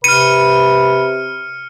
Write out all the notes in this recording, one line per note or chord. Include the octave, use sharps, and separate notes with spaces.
C3 B4 F6 C#7 D#7